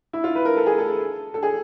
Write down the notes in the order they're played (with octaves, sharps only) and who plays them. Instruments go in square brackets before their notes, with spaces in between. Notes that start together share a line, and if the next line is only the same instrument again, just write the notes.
[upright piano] E4
F4
B4
A#4
A4
G#4
A4
A4
G#4